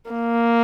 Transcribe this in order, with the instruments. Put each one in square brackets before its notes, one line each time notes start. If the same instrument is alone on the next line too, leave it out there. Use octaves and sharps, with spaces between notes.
[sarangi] A#3